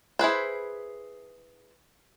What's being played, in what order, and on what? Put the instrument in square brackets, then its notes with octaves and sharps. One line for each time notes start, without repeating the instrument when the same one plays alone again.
[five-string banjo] E4 G#4 B4 C5